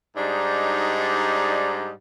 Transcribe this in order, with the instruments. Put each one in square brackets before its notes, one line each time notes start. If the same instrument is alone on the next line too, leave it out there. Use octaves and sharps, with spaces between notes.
[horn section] G#2 G3 D4 D#4